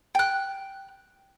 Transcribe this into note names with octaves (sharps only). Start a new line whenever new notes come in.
G5 F#6